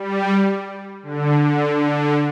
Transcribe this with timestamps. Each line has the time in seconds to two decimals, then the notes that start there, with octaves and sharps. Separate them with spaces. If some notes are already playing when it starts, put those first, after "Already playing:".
Already playing: G3
1.03 D3
1.39 D3
1.75 D3